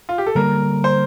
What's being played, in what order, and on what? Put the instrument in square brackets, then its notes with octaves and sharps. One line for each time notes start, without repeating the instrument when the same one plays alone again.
[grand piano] F4
G4
A4
[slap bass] D3 G3 A#3 [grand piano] A#4
[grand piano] C5